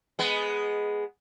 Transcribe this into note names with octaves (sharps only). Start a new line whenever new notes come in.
G#3 B3